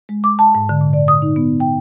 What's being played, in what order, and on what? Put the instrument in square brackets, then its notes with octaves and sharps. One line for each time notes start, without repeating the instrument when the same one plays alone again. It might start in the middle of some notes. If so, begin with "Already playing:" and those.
[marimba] G#3
D6
A5
G#2
D3
A#2
D5
D#6
D#4
B3
G5